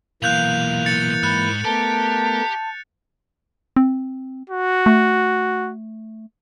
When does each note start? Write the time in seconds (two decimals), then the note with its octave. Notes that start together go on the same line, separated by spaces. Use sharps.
0.23 B1 A#2 E3 A#3 F5 F#6 G6 F7
0.86 A6 C#7
1.23 G#2 B5 F#6
1.65 A3 B3 G4 A#4 A5
3.77 C4
4.49 F#4
4.86 A3